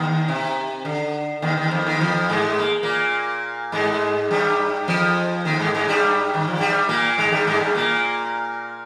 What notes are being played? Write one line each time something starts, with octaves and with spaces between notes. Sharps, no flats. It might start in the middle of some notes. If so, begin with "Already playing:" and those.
Already playing: D#2 D#3
C3
D3
D#2 D#3
D#2 D#3
F2 F3
D#2 D#3
F2 F3
G#2 G#3
A#3
A#2 A#3
G#2 G#3
G2 G3
F2 F3
D#2 D#3
G#2 G#3
G#2 G#3
G2 G3
D#3
F3
G2 G3
A#2 A#3
G#2 G#3
G2 G3
G#2 G#3
G2 G3
A#2 A#3